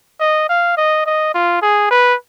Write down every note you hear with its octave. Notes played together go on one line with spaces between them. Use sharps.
D#5
F5
D#5
D#5
F4
G#4
B4